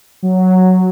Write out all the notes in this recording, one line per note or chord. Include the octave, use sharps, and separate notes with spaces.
F#3